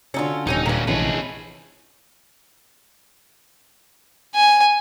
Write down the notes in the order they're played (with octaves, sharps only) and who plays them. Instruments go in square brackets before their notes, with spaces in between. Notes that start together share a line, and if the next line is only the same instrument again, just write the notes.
[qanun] D3 F#4 A4 [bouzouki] C#4 D#4 F4
[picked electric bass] D#1 [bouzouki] E3 B3 C#4 [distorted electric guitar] D#4 [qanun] G4
[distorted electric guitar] A#2 C#4 [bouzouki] A#4 B4
[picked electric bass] A#1 C3 E3 [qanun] G#3 C#4 [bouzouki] A3 [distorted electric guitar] G#4 B4
[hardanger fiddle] G#5